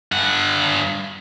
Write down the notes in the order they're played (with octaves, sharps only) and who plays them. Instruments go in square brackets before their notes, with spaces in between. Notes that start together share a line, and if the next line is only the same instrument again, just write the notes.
[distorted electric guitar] G2 F#5